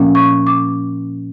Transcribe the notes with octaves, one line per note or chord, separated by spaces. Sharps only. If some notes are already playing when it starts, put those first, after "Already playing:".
Already playing: A#2 F3 A#3 C#4
C#6
D6